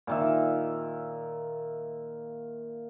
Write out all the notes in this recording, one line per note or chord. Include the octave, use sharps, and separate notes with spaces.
A#2 D#3 E5